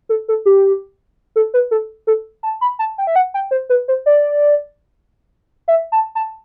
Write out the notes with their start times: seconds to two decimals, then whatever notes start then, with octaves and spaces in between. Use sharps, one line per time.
0.09 A4
0.28 A4
0.46 G4
1.36 A4
1.54 B4
1.71 A4
2.07 A4
2.43 A5
2.61 B5
2.79 A5
2.98 G5
3.07 E5
3.16 F#5
3.34 G5
3.51 C5
3.69 B4
3.88 C5
4.06 D5
5.68 E5
5.92 A5
6.15 A5